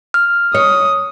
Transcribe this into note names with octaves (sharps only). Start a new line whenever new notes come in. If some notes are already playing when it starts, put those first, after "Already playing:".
F6
C#5 D#6